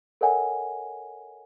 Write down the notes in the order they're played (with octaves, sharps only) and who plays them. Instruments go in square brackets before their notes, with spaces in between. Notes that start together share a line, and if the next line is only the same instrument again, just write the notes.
[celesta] A4 A#4 C#5 D#5 F#5 G#5